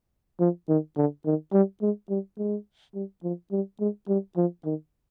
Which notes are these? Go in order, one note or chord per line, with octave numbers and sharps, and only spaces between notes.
F3
D#3
D3
D#3
G3
G#3
G3
G#3
G3
F3
G3
G#3
G3
F3
D#3